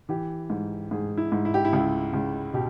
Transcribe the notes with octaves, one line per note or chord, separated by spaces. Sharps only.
E3 G4
G#2
G#2 G#4
E4
G#2
E4
G4
E4
C#2
C#2
B2 G4